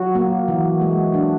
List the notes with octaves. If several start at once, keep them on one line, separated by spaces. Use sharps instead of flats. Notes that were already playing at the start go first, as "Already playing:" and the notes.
Already playing: F#3 F#4
A#3
E3 F#4
G#3
D4